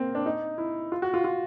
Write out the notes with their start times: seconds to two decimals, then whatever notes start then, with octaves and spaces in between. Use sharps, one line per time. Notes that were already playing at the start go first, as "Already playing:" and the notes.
Already playing: A#3 C4
0.15 D4
0.26 D#4
0.58 E4
0.92 F4
1.02 F#4
1.14 F4
1.24 F4